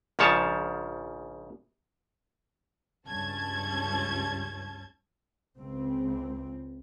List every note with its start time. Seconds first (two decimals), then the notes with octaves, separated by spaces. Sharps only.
0.19 A#1 G#2 C#3 F3 C#5 A5
3.08 C#2 G2 C#4 A5 G#6
5.58 C#2 C4